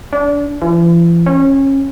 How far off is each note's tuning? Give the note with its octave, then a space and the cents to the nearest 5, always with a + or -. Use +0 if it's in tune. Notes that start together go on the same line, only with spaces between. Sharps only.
D4 -30
E3 +45
C#4 -25